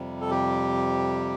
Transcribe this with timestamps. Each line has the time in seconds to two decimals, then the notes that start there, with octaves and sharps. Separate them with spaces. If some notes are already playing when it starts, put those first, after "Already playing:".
Already playing: F2 C3 G3
0.21 A4
0.31 G4